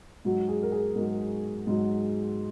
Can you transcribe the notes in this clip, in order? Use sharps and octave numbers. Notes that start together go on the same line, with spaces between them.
G#2 F#3 F#4
G#4
A#4
G#4
G#2 F#3 A#4
G#2 F#3